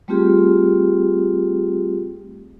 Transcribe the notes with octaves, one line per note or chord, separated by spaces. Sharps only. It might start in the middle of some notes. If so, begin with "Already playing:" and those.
G3 A3 C4 F4 G4 G#4